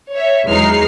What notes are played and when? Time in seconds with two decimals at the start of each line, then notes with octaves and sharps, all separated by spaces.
0.12 C#5 E5
0.47 E2 F#3 G#3 D#4 F6 C7